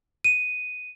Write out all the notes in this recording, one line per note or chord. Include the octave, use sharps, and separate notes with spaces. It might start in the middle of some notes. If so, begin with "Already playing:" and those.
D#7